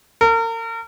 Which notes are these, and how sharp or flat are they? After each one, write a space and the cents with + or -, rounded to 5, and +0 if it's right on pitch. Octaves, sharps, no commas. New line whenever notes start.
A#4 -40